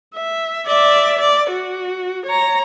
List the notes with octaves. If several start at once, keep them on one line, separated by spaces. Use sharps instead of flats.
E5
D5 E5
D5
F#4
C#5 A#5